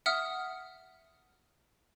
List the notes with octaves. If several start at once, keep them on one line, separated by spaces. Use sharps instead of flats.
E5 F#5 D#6 F6